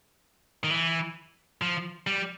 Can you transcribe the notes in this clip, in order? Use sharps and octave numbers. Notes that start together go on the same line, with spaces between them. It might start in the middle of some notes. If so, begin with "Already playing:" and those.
D#3
E3
F3
G3